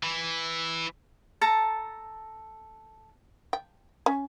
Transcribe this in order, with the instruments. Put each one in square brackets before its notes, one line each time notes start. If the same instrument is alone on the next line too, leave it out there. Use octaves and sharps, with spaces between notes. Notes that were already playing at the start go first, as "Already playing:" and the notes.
[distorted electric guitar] E3
[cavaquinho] A4 A5 A#5
[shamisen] G5
C#4